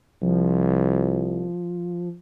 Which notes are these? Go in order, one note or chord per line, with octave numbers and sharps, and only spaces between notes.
C2 F3